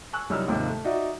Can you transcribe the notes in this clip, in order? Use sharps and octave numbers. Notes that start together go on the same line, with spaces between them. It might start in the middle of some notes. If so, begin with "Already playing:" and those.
G#5 C#6 E6 F#6
C2 F#2 G3 D#4 E6 F6
D#2 G#2 C3 F3 G#3 A#3
A3
D#4 F#4 D5 E5